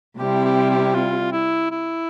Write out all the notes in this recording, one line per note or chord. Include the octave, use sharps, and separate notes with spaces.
C3 G3 C4 E4 G4
G4
G4
F4
E4
E4